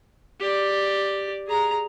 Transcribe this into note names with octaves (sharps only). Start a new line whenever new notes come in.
G4 D5
G#4 A#5